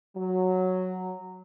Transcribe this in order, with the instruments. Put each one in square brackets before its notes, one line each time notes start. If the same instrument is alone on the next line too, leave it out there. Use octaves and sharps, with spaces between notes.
[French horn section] F#3